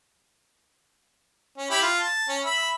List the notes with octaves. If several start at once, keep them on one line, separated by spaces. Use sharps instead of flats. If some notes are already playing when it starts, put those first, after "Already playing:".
C#4
E4 G4 B5
F4
A5
C#4
E5 B5